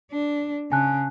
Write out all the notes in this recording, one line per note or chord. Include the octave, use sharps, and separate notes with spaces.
D4
C#3 G#5 A5 F#6